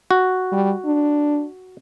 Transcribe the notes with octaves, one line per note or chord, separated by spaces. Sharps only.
F#4
G3
D4